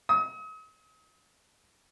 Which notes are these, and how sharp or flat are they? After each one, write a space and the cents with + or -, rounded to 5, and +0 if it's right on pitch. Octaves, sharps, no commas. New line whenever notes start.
D#6 +40